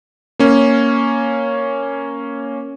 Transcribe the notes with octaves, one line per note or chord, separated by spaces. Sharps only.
A#3 C#4